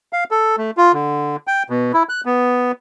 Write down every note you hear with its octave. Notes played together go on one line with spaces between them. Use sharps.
F5
A4
A3
F4
D3
G5
B2
E4
F#6
B3